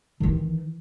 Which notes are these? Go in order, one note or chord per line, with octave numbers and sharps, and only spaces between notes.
D#3 E3